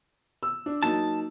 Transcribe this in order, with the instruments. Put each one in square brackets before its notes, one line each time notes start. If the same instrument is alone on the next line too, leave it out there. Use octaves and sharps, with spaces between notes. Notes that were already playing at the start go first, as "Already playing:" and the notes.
[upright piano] E6
D4
[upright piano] F#3 A#3 D#4 [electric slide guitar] A5